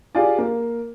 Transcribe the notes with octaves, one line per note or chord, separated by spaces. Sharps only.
F4 G4 G#4 D5
A#3